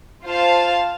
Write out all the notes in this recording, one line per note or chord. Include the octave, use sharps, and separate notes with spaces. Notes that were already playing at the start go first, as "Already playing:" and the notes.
F4 C5 F5 A5